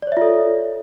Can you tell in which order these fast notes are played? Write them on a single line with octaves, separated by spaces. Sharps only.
D5 C#5 E5 F4 A4